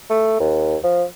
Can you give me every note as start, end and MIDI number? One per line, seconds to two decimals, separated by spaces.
0.10 0.37 57
0.40 0.76 39
0.84 1.03 53